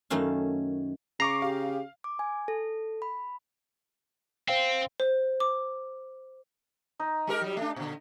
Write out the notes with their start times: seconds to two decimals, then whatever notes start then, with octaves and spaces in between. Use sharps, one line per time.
0.10 F#2 D#3 A3 C#4 F5
1.20 C#3 A#5 C#6 D6 C7
1.42 G4 F5
2.04 D6
2.19 G#5
2.48 A4
3.02 B5
4.48 C4 C5 F5 G5
5.00 C5
5.40 D6
6.99 D#4
7.27 G#3 G4 A#4
7.41 F#3 G3
7.57 A3 D4
7.76 A#2 D3